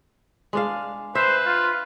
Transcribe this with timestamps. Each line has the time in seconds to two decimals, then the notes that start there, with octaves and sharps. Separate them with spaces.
0.53 G#3 D4 F5
1.15 B4 C5 E5
1.46 F4